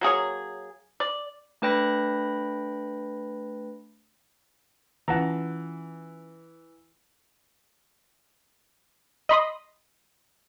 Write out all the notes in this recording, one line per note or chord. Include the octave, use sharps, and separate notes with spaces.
F#3 A#3 G#4 C#5
D5
A3 D4 B4 G5 B5 A#6
E3 C#4 F4 F#5 A5 A#5
D#5 B5 C6 D#6